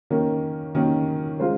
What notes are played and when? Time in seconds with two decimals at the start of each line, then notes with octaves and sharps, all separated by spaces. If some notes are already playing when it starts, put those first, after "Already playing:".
0.10 D#3 A#3 C#4
0.75 D#3 A#3 C#4
1.40 G#3 C#4 F4 C5